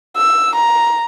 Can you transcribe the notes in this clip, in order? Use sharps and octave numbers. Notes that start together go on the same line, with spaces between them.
E6
A#5